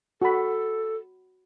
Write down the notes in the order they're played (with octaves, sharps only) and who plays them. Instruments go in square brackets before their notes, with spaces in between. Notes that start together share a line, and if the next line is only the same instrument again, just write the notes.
[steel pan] F#4 B5 [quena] A4